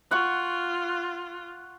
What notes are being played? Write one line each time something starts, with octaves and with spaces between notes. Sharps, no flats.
F4 F#5 C#6